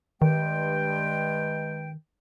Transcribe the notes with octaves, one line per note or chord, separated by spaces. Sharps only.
G2 D#3 G#3 G5